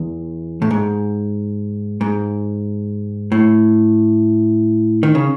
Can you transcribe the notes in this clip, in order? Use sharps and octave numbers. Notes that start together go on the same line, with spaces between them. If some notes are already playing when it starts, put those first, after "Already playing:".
Already playing: E2
A2
G#2
G#2
A2
D#3
C#3